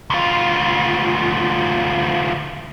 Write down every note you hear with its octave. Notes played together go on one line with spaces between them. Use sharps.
D2 F4